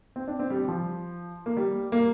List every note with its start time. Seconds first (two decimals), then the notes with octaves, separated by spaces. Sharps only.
0.16 C4
0.28 D4
0.39 C4
0.50 G3
0.68 F3
1.46 A#3
1.57 G3
1.92 A#3